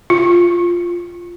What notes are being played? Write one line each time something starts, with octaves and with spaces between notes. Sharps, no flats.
F4